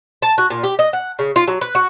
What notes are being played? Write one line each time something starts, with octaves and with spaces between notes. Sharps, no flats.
A5
F#4
A#2
G4
D#5
F#5
C#3
F4
F#3
B4
F#4